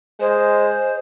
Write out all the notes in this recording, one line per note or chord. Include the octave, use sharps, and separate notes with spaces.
G#3 C5